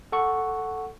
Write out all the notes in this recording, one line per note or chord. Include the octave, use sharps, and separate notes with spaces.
A4 F#5 C#6